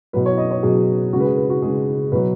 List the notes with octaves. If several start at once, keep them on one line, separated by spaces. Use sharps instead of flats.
B2 F#3 B4
C#5
D#5
C#5
B2 F#3 G#4
C#3 G#3 F#4
B4
G#4
B4
F#4
C#3 G#3 G#4
B2 F#3 B4